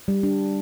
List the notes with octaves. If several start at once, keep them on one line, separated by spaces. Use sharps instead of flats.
G3
D4